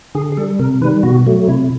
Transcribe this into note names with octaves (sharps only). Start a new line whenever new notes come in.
D3 G#4
G#4
G3 A4
C3 A#4
D#3 G3 B4
B2 F#4
F#3 A3
C3 E4